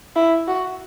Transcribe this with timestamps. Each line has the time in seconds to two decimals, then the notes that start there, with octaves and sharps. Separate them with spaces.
0.16 E4
0.48 F#4